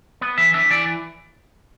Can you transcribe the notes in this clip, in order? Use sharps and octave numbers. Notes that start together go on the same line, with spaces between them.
B3
E3 E5
D4 E5
E3 D5